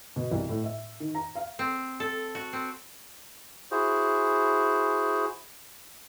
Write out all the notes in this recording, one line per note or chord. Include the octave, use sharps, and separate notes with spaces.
B2
C2
A2
E5
D#3
A#5
F5
C4
A4
F#4
C4
E4 F#4 G#4 C5